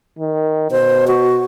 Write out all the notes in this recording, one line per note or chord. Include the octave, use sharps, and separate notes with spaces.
D#3
B2 C5
F#4